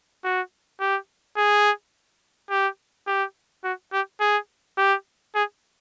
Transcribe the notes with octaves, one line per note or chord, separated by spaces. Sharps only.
F#4
G4
G#4
G4
G4
F#4
G4
G#4
G4
G#4